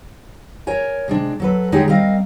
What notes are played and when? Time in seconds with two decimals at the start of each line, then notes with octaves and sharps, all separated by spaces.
0.67 A#4 C#5 G#5
1.08 C3 G#3 D4
1.40 F#3 A4 B4
1.72 D3 G#3 D#4 G4 C#5
1.88 G3 C4 A#4 D#5 F5